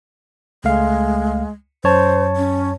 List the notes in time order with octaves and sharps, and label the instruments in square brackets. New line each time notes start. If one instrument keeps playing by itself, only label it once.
[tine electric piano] C#2 A3 F5 [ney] G#3
[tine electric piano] F#2 C#5 A5 [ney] C5
[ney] C#4